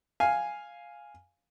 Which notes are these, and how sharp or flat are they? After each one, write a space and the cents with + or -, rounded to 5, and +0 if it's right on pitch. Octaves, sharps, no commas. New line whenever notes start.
F5 +0 G#5 +0